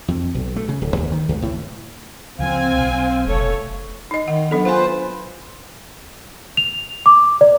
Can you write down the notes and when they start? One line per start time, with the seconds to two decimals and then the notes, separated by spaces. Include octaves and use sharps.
0.08 F2
0.35 B1
0.56 A3
0.69 C#3
0.81 D1
0.96 D#2
1.12 D#3
1.29 C#2
1.42 A2
2.39 C#2 F3 C4 F5 G#5
2.77 B1
3.27 F1 A3 C#5
4.11 D#4 D#5
4.28 D#3 F#5
4.51 F#3 B3 D4 A4
4.65 F4 B4 C5 F#5 G#5
6.57 F7
7.06 D6
7.41 D5